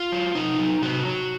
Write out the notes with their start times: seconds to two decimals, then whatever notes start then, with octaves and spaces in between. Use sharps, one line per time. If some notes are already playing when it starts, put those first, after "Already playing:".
Already playing: F4
0.12 F#3
0.35 C3 D#4
0.58 F#3
0.82 C3 F#4
1.05 F#3